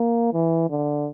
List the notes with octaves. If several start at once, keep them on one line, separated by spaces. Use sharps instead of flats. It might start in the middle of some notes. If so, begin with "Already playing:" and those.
Already playing: A#3
E3
D3